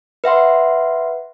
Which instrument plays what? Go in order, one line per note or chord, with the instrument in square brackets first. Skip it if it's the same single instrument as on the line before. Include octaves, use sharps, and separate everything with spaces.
[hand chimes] B4 E5 F#5 C6